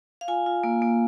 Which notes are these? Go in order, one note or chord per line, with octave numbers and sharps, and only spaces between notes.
F5
F4 G#5
F4
A#3
A#3